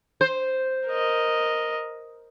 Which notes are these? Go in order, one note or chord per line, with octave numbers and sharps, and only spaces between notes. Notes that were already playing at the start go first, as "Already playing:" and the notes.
C5
A#4 D#5